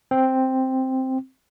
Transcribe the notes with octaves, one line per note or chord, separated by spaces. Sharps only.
C4